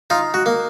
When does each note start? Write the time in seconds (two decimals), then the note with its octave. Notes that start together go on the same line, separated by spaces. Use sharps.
0.10 D#4 F4
0.34 F#4
0.46 A#3